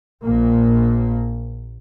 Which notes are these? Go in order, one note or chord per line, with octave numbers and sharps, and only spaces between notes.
A#1 A#2 A#3